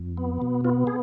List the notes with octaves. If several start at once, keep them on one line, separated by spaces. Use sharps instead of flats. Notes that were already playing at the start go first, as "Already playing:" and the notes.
Already playing: F2
B3
B2
B3 F4
G#4